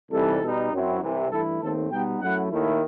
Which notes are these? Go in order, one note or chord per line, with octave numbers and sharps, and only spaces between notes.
C2 C3 E3 G3 D#4 A4
B2 G3 D#4
F#2 F#3 C4 E4
C2 C3 E3
G2 E3 A3 E4 A4
D#2 D#3 A3 C4 A4
B2 G3 B3 D#4 G5
F#2 F#3 A3 E4 F#5
D#2 D#3 A3 E4